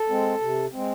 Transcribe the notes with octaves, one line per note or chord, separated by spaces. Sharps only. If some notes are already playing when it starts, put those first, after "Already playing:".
Already playing: A4
G#3 C4
C3
G#3 C4